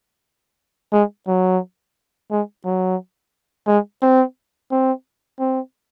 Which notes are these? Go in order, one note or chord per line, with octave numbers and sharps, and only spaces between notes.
G#3
F#3
G#3
F#3
G#3
C4
C4
C4